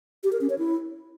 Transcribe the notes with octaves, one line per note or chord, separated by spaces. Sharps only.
G4
A#4
C#4
C#5
E4